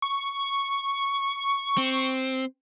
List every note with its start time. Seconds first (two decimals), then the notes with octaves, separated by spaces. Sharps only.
0.02 C#6
1.78 C4